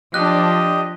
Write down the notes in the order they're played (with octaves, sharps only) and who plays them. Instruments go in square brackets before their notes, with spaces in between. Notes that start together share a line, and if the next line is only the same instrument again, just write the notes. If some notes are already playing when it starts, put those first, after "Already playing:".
[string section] F3 D4 [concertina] G4 D#5 [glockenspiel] F#6